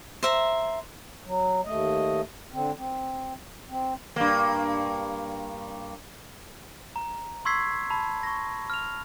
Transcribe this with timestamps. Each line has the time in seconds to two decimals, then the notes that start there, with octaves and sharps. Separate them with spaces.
0.23 C5 E5 A#5
1.25 F#3
1.65 D#2 A3 D#5
2.52 D3 C4
2.77 C4
3.69 C4
4.16 G2 A#3
6.96 A#5
7.45 C6 C#6 E6 G#6 B6 C7
7.90 A5 B5
8.23 C#6 A#6
8.70 F6 F7